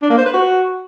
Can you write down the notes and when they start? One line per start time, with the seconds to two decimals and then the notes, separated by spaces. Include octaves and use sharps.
0.02 D4
0.10 A#3
0.18 C5
0.26 B4
0.34 F#4